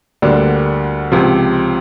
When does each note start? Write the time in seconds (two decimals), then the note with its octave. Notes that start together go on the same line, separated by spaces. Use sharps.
0.22 D2 D3 G3 A#3 D4
1.12 C#2 C3 F3